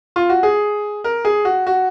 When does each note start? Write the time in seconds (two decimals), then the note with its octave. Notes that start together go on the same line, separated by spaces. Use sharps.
0.16 F4
0.29 F#4
0.43 G#4
1.04 A#4
1.25 G#4
1.45 F#4
1.67 F#4